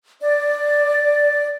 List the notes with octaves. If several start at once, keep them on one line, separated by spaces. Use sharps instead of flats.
D5